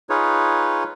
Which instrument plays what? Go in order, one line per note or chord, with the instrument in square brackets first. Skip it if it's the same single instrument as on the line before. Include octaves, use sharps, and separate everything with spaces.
[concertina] D#4 F4 G#4 B4 C#5